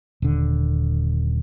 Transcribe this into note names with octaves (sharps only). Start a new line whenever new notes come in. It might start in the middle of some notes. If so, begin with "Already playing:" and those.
D#1 D3